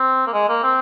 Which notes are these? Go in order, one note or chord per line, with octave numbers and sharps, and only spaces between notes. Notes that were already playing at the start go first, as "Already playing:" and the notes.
Already playing: C4
A#3
G#3
A#3
C4